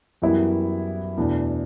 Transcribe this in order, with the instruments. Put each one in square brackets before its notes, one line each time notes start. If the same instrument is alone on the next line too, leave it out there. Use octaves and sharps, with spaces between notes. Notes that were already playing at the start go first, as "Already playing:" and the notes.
[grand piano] F#2 E3 G3 B3 E4
E2 B2 A3 D4